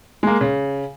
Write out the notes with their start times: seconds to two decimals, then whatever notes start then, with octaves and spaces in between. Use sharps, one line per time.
0.23 G#3 A#3
0.41 C#3